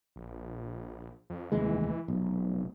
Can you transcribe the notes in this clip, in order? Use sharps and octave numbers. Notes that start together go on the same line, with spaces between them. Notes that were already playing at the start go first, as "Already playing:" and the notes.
A#1
F2
F1 D#2 E3 G#3
F1 B1